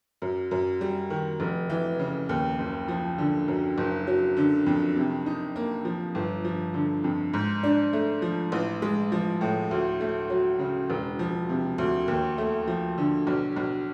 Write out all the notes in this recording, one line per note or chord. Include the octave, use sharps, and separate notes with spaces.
F#2
F#2
G3
D#3
F1
E3
C#3
D#2
F#1
F3
D3
F#2
F#1
F#3
D3
F2
C3
D#4
A#3
F3
G1
F3
D3
F2
G#2
D4
A3
F3
A1
G#3
F3
A2
D2
A3
F#3
C#3
E1
F3
C3
D2
D#2
A3
F3
D3
B1
B1